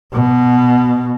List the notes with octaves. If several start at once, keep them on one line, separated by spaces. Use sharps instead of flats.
B2